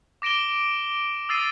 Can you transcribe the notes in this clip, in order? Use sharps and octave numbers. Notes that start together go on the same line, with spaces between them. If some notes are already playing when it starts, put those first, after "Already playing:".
D6 A#6 D7 E7 G7
D#6 E6 A6 C7 D#7